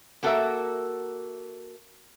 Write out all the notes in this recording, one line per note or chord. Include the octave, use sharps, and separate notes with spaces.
A#3 F#4 A4 A#4 D#5 E5